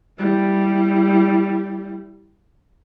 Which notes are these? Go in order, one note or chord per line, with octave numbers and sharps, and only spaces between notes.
G3 E4